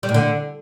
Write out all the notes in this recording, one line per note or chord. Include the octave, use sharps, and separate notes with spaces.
G3
A2
D3